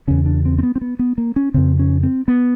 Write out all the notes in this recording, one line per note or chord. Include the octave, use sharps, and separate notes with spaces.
E2 C#3 C#4
D4
C4
C4
B3
C4
B3
B3
A#3
C#4
F2 C#3 C4
C#4
C4
B3